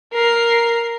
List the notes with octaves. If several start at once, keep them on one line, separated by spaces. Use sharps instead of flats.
A#4 C7